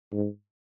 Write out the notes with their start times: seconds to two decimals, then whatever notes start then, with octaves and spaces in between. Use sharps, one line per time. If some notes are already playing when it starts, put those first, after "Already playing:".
0.12 G#2